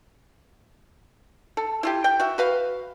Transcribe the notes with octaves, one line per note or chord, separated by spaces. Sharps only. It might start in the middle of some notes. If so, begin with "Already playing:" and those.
A4
E4 F4 G4
G5
F#4 E5
F#4 B4 F5